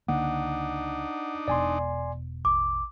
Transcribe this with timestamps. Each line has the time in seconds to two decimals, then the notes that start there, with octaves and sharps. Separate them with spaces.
0.08 C#2 D3 A#3 D4 D#4 F#5
1.48 E1 B2 D5 G#5 C6
2.45 A1 D6